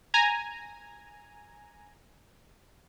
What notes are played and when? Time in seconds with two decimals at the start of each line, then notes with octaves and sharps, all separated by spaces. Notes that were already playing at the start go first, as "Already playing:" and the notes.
0.14 G#5 A#5